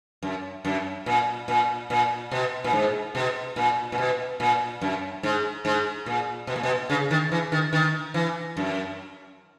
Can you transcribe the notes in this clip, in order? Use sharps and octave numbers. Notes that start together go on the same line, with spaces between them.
F#2
F#2
A#2
A#2
A#2
B2
A#2
G#2
B2
A#2
A#2
B2
A#2
F#2
G#2
G#2
A#2
B2
A#2
B2
C#3
D#3
E3
D#3
D#3
E3
F#2